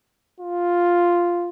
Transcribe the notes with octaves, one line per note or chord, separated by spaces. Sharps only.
F4